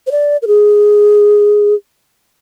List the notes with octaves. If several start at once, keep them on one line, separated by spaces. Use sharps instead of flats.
C5
D5
A#4
G#4